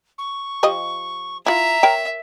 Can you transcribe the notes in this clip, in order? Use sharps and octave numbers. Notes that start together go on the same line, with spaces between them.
C#6
F3 G4 D#5
E4 F4 E5 A#5
A#4 C#5 G5